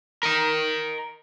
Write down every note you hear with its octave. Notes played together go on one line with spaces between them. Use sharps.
A#4 D#5